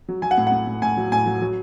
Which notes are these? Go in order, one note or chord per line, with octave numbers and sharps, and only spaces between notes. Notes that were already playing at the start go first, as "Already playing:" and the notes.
F#3
F#3 G#5
F#5
A2
F#5
A2
A2
A2 G#5
F#3
A2 G#5
F#3
F#3